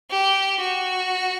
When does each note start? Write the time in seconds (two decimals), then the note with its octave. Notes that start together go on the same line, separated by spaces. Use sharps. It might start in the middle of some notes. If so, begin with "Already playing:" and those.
0.11 G4
0.60 F#4